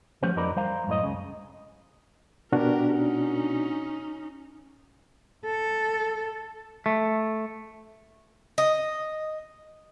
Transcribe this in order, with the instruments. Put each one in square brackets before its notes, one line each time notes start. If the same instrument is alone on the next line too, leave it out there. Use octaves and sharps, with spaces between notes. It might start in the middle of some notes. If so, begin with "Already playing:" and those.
[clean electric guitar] F3 A3 B3 C#4 G4 C5
F2 F#3 D#4 A#4 D5 B5
G3 C5 F5 A#5
F#2 A2 D#5
C#2 C#3
[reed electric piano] B2 D4 F#4 [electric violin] G4 A#4
[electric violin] C#4 D#4
[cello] A4
[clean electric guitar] A3
[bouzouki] D#5